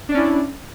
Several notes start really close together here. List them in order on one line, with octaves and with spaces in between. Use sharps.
D4 D5 C#4 E4